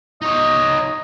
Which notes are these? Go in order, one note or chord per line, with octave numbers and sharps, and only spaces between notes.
D#4 C#5 D#5